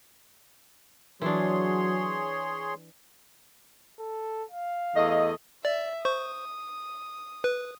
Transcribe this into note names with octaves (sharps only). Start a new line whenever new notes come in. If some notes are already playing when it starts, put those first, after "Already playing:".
E3 F#3 D4 G#4 C#5 C6
A4
F5
E2 A3 D#5
D5 E5
C5 C#6 D#6
B4